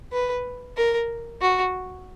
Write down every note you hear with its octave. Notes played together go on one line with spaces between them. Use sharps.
B4
A#4
F#4